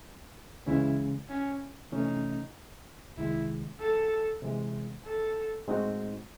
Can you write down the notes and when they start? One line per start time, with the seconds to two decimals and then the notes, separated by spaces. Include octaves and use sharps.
0.66 C#2 C#3 E3 G#3 C#4 E4
1.29 C#4
1.92 C3 E3 A3 C#4 D#4
3.17 C2 C3 D#3 G#3 E4
3.80 A4
4.42 C3 E3 G#3
5.05 A4
5.67 A2 G#3 C4 D#4 F#4